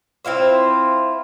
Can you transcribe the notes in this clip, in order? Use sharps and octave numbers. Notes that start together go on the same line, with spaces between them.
C4 E4 F4 C5